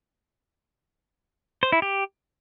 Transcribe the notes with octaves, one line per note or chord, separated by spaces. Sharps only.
C5
E4
G4